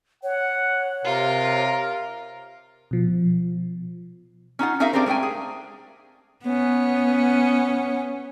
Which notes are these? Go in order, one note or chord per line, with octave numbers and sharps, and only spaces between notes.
C#5 F#5
C3 F4 A#4
B2 F3
C#4 D#4 F4 F#5
C#4 D#4 G#4 A#4 E5 F5
C4 D4 G4 G#4 A#4 C5
G#3 A3 A#4 G5 G#5
G#4
B3 C#4